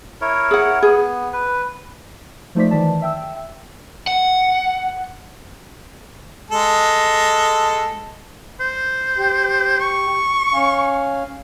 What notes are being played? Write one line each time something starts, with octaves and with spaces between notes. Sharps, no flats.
E4 A#4 C#5
G#4 F#5
B3 G#4
B4
F3 A3 D#4 C5 D5 B6
D#3 E3 D5 A5
E5 G5 E6
F#5
G#3 A4
C5
G4
C#6
C#4 F5 G#5